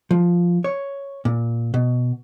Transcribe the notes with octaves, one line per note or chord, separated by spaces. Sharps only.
F3
C#5
A#2
B2